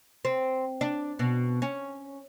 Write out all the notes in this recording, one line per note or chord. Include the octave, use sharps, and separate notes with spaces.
C4
D4
B2
C#4